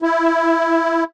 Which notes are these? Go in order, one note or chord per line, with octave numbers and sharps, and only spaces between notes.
E4